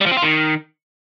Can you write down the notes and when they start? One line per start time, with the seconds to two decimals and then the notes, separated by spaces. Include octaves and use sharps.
0.01 G3
0.06 F3
0.12 C4
0.17 F4
0.22 D#3